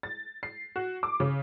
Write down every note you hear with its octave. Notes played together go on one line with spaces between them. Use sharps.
A6
C7
F#4
D6
C#3